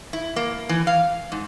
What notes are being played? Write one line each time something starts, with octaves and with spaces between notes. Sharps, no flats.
E4
A#3
E3
F5
G#2